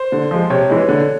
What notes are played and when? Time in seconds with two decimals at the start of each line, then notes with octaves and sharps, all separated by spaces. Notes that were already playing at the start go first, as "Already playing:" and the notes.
Already playing: C5
0.12 D3
0.31 F3 G#3
0.50 C3 C#5
0.70 E3 G#3
0.88 D3